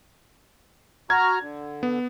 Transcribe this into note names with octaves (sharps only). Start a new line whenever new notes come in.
F#4 A#5 F6 G#6
D3
B3